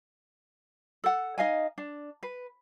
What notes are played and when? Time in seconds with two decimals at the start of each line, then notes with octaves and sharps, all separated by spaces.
1.04 A4 F#5
1.38 D#4 D#5 F5 G#5
1.78 D4
2.23 B4